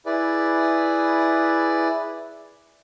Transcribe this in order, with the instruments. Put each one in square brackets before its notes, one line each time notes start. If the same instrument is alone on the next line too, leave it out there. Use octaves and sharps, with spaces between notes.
[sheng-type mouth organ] E4 G#4 B4 D5